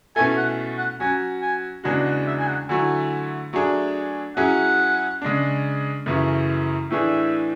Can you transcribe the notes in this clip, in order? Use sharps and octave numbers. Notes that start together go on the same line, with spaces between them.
B2 A3 C#4 E4 A4 G#5
F#5
F#5
F#3 C#4 F#4 G#5
G#5
E2 C#3 G#3 D4 F#4 G#5
F#5
E5
G#5
F#5
D3 F#3 A3 E4 G#5
F#3 A3 D4 G#4
F#3 C#4 E4 G#4 F#5
C#3 G#3 D4
F#2 C#3 E3 A3 E4
A2 E3 A3 D4 G#4 E5